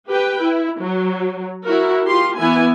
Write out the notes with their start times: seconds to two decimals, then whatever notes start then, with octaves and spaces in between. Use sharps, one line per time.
0.10 G4 B4 G5
0.41 E4
0.81 F#3
1.65 E4 F#4 A#4
2.08 F4 G4 C6
2.39 E3 B3 E4 G#5